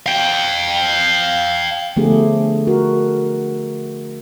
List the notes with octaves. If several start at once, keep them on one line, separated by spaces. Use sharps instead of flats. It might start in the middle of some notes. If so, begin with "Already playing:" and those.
F5 G5
D3 F3 A3 B3 G4 G#4
F#4 A#4